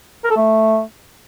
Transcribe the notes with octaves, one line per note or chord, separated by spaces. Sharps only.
A#4
A4
A3